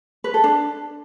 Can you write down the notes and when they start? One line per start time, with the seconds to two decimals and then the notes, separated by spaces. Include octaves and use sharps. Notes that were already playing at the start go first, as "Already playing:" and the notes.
0.24 B4
0.34 A4
0.44 D4